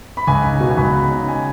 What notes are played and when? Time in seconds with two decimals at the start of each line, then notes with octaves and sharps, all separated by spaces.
0.17 B5
0.27 C#2 G#5
0.44 D#4
0.61 B2
0.70 G#5
0.77 C#2 B5
0.95 D#4
1.10 C#3
1.28 G#5